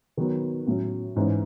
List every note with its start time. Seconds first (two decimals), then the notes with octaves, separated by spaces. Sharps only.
0.17 D#3 F#3 B3
0.67 A2 F#3 C#4
1.16 G#2 E3 G#3 C#4